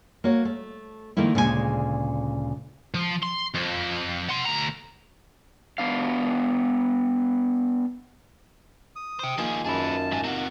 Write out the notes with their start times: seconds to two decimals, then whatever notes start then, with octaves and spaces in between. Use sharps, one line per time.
0.24 A#3 F#4 C#5
0.45 A3
1.17 D#3 F3 A3 A#3 E4
1.35 D2 A#2 C#3 G#3 G#4 G#5
2.94 F3
3.23 C6
3.54 F2
4.29 F#5 C6
4.46 D2 A#5
5.78 B3 D4 F5
8.96 D#6
9.20 G4 C5
9.38 D#3 F3 A#3 F4 G#4
9.65 F#2 G#4 B4 A5
10.12 G#2 G#5
10.24 C3 F#4